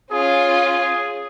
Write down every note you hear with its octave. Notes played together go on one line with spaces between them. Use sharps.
C#4 F4 G#4